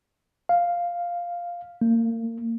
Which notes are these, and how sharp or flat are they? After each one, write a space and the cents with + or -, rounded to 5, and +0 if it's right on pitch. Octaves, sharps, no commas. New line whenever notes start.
F5 +0
A#3 -35